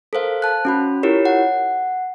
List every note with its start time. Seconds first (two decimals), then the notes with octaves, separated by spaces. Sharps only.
0.13 A4 A#4 C5 F5
0.42 A5 F#6
0.65 C#4 F#4 B5
1.03 E4 F4 G4 A#4 C#5
1.25 F#5